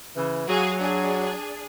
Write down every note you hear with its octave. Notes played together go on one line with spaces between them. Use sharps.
C#3 E3
F#3 F#4 G#4 F5
D4 G#4